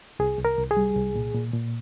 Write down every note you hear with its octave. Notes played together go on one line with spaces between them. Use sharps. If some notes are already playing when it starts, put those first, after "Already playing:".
C2 G#4
C2
A#4
C2
G#4
G3
C2
A#2
A#2
A#2